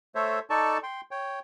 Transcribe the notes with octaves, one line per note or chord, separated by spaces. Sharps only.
A3 A4 C5 C#5 E5
D#4 A4 D5 A5 C#6
G5 C6
C#5 G5